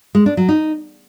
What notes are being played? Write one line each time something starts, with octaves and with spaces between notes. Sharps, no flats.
G#3
D4
F#3
D#4